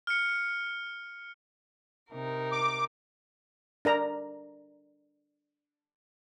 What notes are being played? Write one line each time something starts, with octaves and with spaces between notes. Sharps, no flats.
F6 C#7
C3 D#4 A#4
D6
D4 A#4 A#5